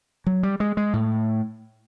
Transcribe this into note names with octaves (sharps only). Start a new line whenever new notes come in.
F#3
G3
G#3
G#3
A2